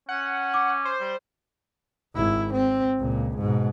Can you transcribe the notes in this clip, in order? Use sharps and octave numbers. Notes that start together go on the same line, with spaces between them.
C#4 F#5
D6
C5
G3
G#1 E4
C4
C#2 A#2
G#2 B2